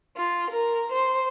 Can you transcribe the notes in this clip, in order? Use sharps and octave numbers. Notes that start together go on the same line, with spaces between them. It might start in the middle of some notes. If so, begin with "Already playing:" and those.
F4
A#4
C5